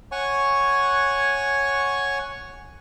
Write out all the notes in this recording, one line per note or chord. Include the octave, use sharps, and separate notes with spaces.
C#5 F#5 G#5 C#6